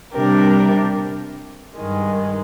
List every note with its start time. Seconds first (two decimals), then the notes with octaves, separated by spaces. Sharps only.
0.13 C3 G3 D4 G4 A#4
1.76 G2 D#3 G#3